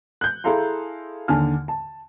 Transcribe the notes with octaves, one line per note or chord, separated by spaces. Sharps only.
F#6 G6
E4 G#4 A4 F5 A#5 C6
D#2 D3 G#5 A5 F6
A5